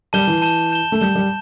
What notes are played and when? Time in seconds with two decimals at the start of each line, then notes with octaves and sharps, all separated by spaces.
0.13 G3 A5 G6 E7 G7
0.27 E3
0.42 A5 G6 E7 G7
0.72 G6 E7 G7
0.92 A3
1.00 G3 G6 E7 G7
1.16 G3